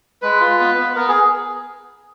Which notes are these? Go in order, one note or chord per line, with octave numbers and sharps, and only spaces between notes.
G#3 B4
F4
B3
B3
B3 A#4
G#4